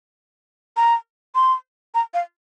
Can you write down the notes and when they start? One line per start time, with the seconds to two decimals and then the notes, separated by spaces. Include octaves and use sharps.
0.77 A#5
1.35 C6
1.95 A#5
2.14 F5